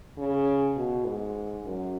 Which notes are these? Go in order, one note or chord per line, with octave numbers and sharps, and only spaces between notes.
C#3
B2
G#2
F#2